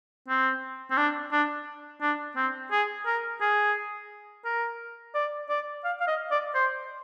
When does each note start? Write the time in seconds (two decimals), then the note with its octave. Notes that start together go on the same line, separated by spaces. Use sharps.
0.28 C4
0.91 C4
0.97 D4
1.32 D4
2.01 D4
2.36 C4
2.72 G#4
3.06 A#4
3.41 G#4
4.45 A#4
5.14 D5
5.49 D5
5.84 F5
6.00 F5
6.08 D#5
6.31 D5
6.55 C5